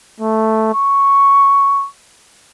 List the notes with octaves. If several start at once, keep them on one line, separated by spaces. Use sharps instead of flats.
A3
C#6